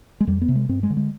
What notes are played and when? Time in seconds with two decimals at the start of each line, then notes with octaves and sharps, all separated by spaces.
0.20 G#3
0.27 F2 G3
0.41 B3
0.48 C3
0.55 G#3
0.69 G2 C4
0.83 G#3
0.90 D3
0.97 G#3